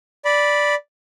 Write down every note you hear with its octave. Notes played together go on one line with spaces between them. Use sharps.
D5 B5